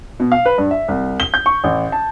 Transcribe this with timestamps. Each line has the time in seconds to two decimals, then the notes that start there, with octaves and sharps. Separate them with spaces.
0.20 B2
0.32 F5
0.46 B4
0.58 G2
0.71 E5
0.88 C2
1.20 G7
1.34 G6
1.46 C#6
1.64 A1
1.92 A5